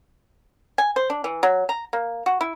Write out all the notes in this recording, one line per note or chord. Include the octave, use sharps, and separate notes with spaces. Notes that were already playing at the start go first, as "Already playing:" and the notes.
G#5
C5
D4
E3
F#3
A#5
A#3
F#4
E4